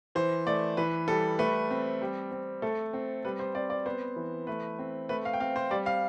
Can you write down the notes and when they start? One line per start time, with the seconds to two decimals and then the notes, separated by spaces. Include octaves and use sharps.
0.15 E3 C5
0.47 A3 D5
0.77 E3 B4
1.08 G3 A4
1.39 A3 B4
1.71 C4
2.01 G3
2.31 C4
2.62 A3 A4
2.93 C4
3.25 G3 B4
3.39 C5
3.55 C4 D5
3.70 D5
3.86 B3 C5
4.16 E3
4.47 A3 B4
4.79 C4
5.09 A3 B4
5.25 F5
5.33 G5
5.40 C4 F5
5.56 C5
5.70 G3 D5
5.86 F5